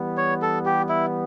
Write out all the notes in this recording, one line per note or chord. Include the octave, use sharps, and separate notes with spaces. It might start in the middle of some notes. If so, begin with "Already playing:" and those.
Already playing: E3 G3 B3
C#5
A4
G4
E4